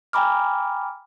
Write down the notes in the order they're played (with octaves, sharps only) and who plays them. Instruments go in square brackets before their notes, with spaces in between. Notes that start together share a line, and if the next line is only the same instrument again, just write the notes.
[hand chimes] G5 G#5 A#5 B5 D6 F6